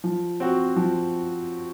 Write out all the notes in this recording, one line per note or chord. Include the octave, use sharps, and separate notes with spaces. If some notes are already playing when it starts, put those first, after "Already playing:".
F3
C4 F#4
F3